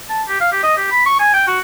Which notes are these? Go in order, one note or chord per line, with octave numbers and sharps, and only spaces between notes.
A5
G4
F5
G4
D#5
G4
B5
C#6
G#5
G5
F#4